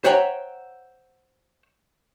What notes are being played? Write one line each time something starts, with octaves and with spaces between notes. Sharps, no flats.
C5 C#5 E5 F#5 G5 A#5